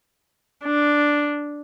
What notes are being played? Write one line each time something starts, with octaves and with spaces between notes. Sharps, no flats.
D4